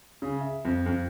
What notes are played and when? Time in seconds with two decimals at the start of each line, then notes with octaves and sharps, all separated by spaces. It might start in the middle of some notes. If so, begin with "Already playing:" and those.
0.22 C#3
0.41 E5
0.65 F2
0.86 F2